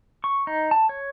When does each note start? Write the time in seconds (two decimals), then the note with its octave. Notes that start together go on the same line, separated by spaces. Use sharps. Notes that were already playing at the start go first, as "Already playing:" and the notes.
0.24 C#6
0.47 D#4
0.71 A5
0.89 C#5